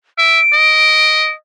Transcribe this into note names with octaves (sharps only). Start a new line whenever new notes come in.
E5 D7
D#5